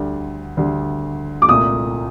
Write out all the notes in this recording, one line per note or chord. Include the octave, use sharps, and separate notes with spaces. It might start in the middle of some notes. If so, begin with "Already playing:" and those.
Already playing: D2 D3 G3
D2 D3 G3
D6
C2 A#2 A3 D#6